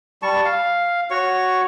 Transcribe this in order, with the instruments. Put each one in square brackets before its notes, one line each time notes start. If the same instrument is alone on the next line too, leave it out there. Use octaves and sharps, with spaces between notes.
[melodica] G3 A5 C#6
F5
F#4 C#5 C#6